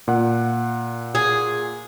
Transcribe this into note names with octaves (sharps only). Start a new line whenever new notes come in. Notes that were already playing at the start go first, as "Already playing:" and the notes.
A#2 F#5
G#4